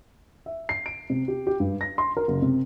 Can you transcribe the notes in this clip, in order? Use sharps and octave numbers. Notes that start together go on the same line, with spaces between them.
E5
C7
D7
C3
G4
G4
G2
A#6
C6
A#4
F#1
C3